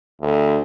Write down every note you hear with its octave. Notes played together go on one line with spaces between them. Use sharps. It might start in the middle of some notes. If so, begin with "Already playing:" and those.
D2